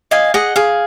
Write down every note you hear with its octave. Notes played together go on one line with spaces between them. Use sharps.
D#5 F5 G#5
G#4 D#5 F#5
G#4 F5